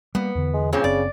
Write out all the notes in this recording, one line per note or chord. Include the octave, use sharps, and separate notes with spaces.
G3 A#3 B3
E2 D3
G#3
G2 A#2 C#3 C4
F#1 C4 D5